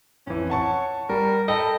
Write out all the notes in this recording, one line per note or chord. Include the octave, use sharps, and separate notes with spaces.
F2 E3 C#4
C#5 F#5 A5 C#6
G3 A#4
A4 D#5 G5 B5